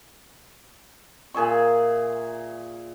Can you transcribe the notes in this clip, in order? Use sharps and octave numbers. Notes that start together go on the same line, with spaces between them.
A#2 G#4 E5 C#6